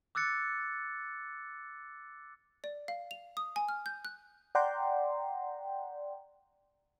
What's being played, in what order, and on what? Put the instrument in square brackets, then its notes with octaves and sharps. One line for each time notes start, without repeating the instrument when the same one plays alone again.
[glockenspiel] D6 E6 F#6 A6 C#7
[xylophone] D5
F5
F7
D#6
G#5
F6
G6
F#6
[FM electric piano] D5 F#5 G5 A#5 C6